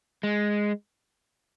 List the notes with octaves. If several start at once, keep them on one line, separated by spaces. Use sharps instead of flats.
G#3